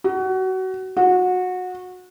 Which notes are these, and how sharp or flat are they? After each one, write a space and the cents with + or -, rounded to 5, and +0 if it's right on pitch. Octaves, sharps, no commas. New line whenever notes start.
F#4 +25
F#4 -20